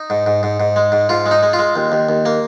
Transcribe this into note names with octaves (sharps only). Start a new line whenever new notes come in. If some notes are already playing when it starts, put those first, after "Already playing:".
Already playing: D#4
G#2
G#2
G#2
G#2
G#3
G#2
G#2 F4
G#3
D#4
G#3
F4
G#3
D#2
D#2
D#2
A#3